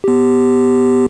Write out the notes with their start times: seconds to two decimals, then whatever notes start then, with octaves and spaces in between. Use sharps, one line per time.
0.04 B3 G4